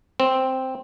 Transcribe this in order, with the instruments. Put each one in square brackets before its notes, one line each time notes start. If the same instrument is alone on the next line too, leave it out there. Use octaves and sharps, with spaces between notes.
[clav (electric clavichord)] C4